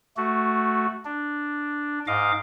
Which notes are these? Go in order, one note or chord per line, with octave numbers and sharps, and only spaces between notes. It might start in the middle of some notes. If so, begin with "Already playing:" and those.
A3 F#4
D4
G#2 D#5 F5 D6